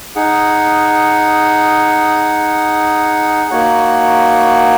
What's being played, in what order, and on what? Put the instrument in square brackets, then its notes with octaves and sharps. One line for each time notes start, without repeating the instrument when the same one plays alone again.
[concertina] D#4 G#4 F#5
A#3 D#4 F#4 C#5 F#5